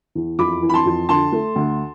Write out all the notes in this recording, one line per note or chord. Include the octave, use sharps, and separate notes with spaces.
E2
F2 B5 D6
E3
B5
A5 C6
F2
D3 A5 C6
A3
D2